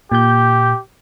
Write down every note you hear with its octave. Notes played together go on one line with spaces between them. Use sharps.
A#2 G4 G6